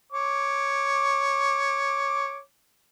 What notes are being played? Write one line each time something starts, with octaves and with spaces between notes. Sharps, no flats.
C#5 D6